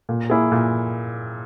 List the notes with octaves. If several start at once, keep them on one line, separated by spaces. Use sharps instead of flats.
A#2
A#3 E4 G#4
A#2